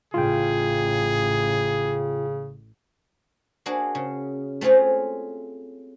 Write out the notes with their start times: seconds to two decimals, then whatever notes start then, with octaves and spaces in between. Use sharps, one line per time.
0.14 A1 C#3 F4 G#4 G5
3.66 A#3 D4 F#4 G#4
3.95 C#3
4.61 A3 C4 F4 G#4 C#5